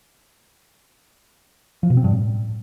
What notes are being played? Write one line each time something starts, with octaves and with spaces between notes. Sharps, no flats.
F3
B2
C4
G2
A2